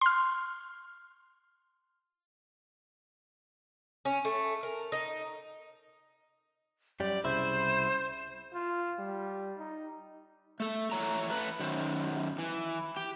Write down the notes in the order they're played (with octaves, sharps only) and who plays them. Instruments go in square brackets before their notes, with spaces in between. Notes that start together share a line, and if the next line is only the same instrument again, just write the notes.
[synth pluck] C6 F6
[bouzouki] C#4
A3
A#4
D#4
[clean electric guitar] F#2 G3 [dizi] D5
[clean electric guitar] C2 C#3 E4 [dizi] C5
[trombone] F4
G3
D#4
[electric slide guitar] A3 A4
E3 C#5 A#5
A3 B4
F#2 D#3 C5
E3
G4